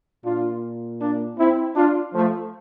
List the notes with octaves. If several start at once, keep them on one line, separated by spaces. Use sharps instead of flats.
A#2 D4 F4
A#3 D4
C4 E4
D4 F4
F3 A3